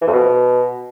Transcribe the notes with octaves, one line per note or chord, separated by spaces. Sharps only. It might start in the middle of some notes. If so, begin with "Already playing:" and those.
E3
F2
B2